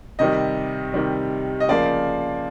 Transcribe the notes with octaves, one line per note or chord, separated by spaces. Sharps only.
C3 D#3 G3 D#5
C3 D#3 G3
D#5
C#3 F3 A#3 D5